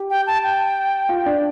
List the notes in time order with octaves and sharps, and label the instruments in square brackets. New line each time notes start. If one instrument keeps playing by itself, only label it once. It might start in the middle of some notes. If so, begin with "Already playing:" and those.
Already playing: [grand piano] G4
[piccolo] G5
A5
G5
[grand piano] F4
D4